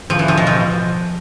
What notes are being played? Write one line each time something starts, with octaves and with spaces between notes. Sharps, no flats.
F3
E3
F3
B2
F3